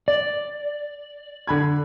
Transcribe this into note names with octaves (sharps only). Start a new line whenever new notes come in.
D5
D3 B5 G#6